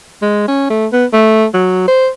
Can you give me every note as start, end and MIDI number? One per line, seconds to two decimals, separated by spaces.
0.22 0.46 56
0.48 0.67 61
0.70 0.87 57
0.92 1.05 59
1.13 1.46 57
1.54 1.86 54
1.88 2.09 72